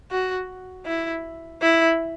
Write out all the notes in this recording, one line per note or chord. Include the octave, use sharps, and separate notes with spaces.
F#4
E4
E4